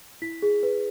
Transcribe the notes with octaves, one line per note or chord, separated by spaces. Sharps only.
E4 B6
G#4
B4